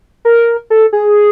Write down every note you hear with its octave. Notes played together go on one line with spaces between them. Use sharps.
A#4
A4
G#4